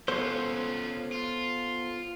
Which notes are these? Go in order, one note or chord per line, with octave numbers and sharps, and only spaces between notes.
B3 C#4 F4 A4 C5
F4